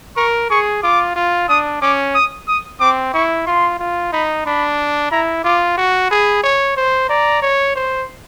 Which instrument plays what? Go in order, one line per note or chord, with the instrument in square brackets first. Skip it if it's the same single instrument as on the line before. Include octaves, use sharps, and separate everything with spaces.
[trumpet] A#4 [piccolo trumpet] C#6
[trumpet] G#4 [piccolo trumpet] C#6
[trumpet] F4 [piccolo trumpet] D6
[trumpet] F4
[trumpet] D4 [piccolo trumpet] D#6
[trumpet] C#4 [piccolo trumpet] D6
[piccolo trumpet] D#6
D#6
[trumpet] C4 [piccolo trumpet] D6
[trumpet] E4 [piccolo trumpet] C#6
[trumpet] F4 [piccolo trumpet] C6
[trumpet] F4
[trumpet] D#4 [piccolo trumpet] B5
[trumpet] D4 [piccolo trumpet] B5
[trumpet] E4 [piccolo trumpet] A#5
[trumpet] F4 [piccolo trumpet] D6
[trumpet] F#4 [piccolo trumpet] C#6
[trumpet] G#4 [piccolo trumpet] B5
[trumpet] C#5
C5
[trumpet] D5 [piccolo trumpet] A#5
[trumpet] C#5
C5